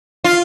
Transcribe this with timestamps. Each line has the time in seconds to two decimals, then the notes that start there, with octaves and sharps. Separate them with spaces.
0.24 F4